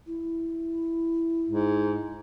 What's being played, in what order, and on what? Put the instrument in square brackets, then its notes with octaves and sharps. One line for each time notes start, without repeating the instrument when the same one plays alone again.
[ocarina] E4
[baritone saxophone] G#2